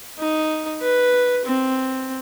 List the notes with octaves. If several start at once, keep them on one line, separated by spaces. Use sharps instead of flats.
D#4
B4
C4